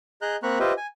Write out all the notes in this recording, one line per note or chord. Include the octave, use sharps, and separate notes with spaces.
G#4 D#5 A#5 F#6 G6
A#3 C4 A#5 B5 C#6 F#6
F4 G4 B4 C5 D#5 E5
G#5